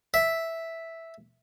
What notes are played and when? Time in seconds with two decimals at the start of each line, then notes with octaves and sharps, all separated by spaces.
0.14 E5